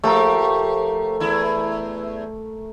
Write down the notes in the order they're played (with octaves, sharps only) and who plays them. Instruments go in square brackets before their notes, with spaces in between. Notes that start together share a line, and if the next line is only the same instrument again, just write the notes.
[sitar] F3 G4 [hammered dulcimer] A3 A#4
[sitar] E2 E4